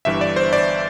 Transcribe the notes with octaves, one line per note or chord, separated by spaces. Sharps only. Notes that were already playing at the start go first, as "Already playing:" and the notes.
G1 G2 E3 E5
D5
C5
D5